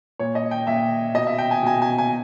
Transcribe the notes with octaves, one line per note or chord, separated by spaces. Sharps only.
A#2 C#5
D#5
G5
A#2 E5
B2 D#5
E5
G5
G#5
B2 G#5
G#5
G#5